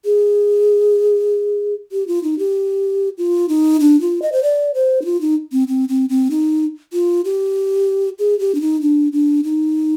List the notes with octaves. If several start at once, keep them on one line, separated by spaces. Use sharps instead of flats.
G#4
G4
F4
D#4
G4
F4
D#4
D4
F4
D#5
C5
D5
C5
D#4
F4
D#4
C4
C4
C4
C4
D#4
F4
G4
G#4
G4
D4
D#4
D4
D4
D#4